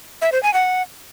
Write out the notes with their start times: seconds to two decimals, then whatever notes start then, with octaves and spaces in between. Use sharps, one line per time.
0.22 E5
0.32 C5
0.43 G#5
0.54 F#5